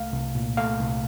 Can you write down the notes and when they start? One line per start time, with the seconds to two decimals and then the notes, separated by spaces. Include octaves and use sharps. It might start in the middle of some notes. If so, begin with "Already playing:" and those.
Already playing: C2 A3 F5
0.13 C2
0.35 A#2
0.57 A3 F5
0.80 C2